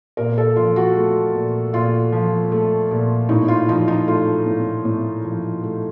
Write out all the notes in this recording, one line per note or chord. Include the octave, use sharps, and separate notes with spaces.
A#2 A#4
A4
F3 F4
F#4
A3
A#2
A#2 F4
F3
A3
A#2
A2 D#4
F4
F3 D#4
D#4
A3 F4
A2
A2
F3
A3